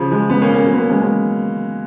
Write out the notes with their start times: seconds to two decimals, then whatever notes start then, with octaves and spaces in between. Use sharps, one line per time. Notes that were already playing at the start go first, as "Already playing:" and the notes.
Already playing: C#3 F3
0.11 F3 G#3
0.30 G#3 B3
0.41 A#3 C#4
0.53 A#3 C#4
0.65 F#3 A#3
0.73 B3
0.78 A#3 C#4
0.90 G#3 B3
1.02 G#3 B3